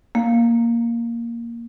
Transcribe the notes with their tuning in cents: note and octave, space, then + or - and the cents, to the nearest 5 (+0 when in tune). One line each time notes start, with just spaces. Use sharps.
A#3 +0 F5 +0